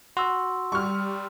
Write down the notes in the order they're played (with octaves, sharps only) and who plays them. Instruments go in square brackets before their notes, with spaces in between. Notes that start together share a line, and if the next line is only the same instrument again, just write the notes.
[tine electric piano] F#4 [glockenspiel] C6 E6
[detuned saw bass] G3 [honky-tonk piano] C#6 F6